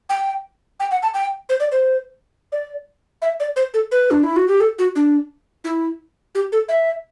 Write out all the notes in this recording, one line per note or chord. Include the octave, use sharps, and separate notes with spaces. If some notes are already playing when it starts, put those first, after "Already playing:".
G5
G5
F#5
A5
G5
C5
D5
C5
D5
E5
D5
C5
A4
B4
D4
E4
F#4
G4
A4
F#4
D4
E4
G4
A4
E5